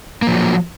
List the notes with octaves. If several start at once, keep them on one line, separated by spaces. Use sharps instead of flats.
F3 F#3 A#3